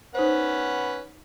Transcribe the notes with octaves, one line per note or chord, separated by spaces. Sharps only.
C#4 D#4 B4 C5 F#5